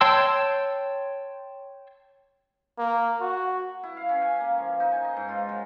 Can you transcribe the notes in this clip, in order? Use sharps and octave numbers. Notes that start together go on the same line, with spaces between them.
C#5 G5 A5 C6 E6
A#3
F#4
E4
F5
C#4
G#5
A#3
F3
D#4
G#5
D#5
G#2
F4
F#3